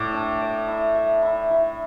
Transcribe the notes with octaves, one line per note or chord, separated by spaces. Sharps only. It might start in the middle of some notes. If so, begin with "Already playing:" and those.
Already playing: A2 D5
D4
D5
E4
E5
E4
E4